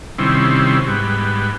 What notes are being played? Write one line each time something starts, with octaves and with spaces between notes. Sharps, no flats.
C3 D#3 G3 C4 C#4 E4
G#2 G3 B3